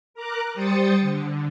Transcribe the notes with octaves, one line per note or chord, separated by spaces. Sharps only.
A#4 A#5 D6 F#6
G3 C5 G5 D#6 A6 C#7
D3